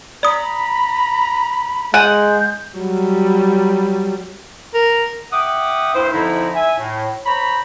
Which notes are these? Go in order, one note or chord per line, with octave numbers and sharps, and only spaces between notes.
D5 A#5 B5 D#6
G#3 F#5 G#5 G6 D#7
F#3 G3
A#4
E5 F#5 G5 D6 D#6
D2 G2 E4 C5
F2 D3 F3 D#4 E4
E5 G#5
A2
C5 C#5 A#5 B5